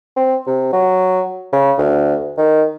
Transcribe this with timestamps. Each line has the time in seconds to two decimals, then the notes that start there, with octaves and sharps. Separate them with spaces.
0.16 C4
0.47 C3
0.73 F#3
1.52 C#3
1.78 D2
2.38 D#3